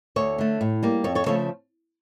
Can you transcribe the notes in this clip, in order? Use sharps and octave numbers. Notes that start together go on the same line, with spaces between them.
D2 A4 C#5
D3 A3
A2
G3 A#3
F2 A4 C#5
A4 C#5
C#3 F3 A3 A4 C#5